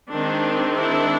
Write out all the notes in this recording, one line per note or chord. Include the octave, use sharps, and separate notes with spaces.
D#3 G#3 C4 D4
D4 E4